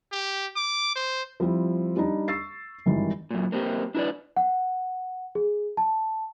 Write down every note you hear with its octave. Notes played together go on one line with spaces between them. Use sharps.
G4
D6
C5
F3 G3 C4 E4
G3 D4 D#4
C#6 E6 A6 C7
G#1 G2 D#3 E3
F#2 A#2
A#3 C4 F#4 G4
D4 E4 A4 B4 D5
F#5
G#4
A5